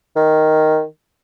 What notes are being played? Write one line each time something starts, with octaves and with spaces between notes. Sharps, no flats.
D#3